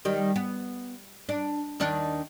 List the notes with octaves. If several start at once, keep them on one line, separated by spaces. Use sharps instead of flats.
D#3 G3
B3
D4
D#2 D#3 D4